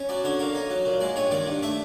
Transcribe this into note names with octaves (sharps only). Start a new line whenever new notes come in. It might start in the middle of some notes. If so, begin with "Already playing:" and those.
Already playing: C#4
F#3 D5
D3 C#5
A#3 C#5
D#4
F#3
A#2
G#3 D5
G2 C#5
D#3 D5
G2
A3 E5